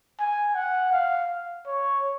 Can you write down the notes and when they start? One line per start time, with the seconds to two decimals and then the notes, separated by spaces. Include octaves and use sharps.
0.20 G#5
0.56 F#5
0.93 F5
1.67 C#5